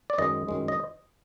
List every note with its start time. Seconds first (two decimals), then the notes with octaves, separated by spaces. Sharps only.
0.10 D5
0.18 F#2 D#3 G#3 D#5
0.48 F#2 D#3 G#3
0.68 D#5